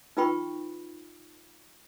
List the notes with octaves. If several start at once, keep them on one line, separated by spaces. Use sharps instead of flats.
D#4 F4 B4 G5 B5 C#6